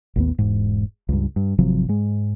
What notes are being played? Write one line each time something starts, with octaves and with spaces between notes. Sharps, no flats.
A1 D#2 B3
E1 G#2
C#2 G2
G2
G#1 C3 F3 F#3
G#2 G#3